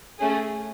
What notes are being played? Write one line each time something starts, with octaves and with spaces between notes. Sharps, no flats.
A3 C#4 G#4